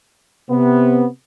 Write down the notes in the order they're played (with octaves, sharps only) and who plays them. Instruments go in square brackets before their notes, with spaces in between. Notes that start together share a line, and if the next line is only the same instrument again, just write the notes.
[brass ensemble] C3 B3